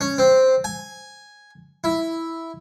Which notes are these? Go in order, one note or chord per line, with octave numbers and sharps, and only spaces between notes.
C#4
C4
G#5
E4